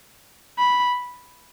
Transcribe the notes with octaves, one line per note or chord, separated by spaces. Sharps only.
B5